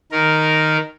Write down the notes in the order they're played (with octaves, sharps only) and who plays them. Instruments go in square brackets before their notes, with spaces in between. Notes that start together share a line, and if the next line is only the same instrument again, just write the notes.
[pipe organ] D#3 A#4